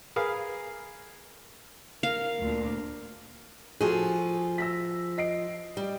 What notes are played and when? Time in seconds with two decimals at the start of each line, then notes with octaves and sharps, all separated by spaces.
0.16 G#4 A#4 B4 F5
2.03 A#4 F5
2.39 D2 A#2 D4
3.81 F3 F#4 G#4 A4 G#5
4.58 E6 A#6 B6
5.18 D#5 C7 D7
5.77 G3